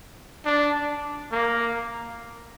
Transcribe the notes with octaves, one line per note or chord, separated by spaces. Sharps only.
D4
A#3